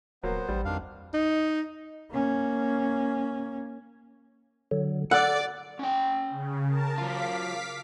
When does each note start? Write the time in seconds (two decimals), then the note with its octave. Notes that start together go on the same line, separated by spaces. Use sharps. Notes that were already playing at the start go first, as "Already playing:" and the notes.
0.23 D#1 F#3 A#3 B3 C5
0.48 A1 G3
0.65 F2 D#3 D4 F5
1.13 D#4
2.11 A#3 C#4
4.71 D3 F#3
5.11 A4 D5 F#5
5.79 C#4 G5
6.30 C#3
6.68 A#4 A5
6.98 F#3 F4 F5 D6 B6